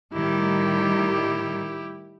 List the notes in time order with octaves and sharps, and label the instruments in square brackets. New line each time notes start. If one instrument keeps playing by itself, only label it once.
[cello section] A2 D#3 G3 [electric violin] E4 G4